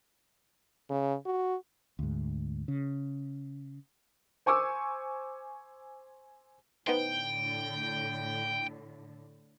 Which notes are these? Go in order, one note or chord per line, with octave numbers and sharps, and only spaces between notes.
C#3
F#4
D2 G#2
C#3
C5 G#5 C#6 D6 E6
A2 D3 B3 D#4 C5 G5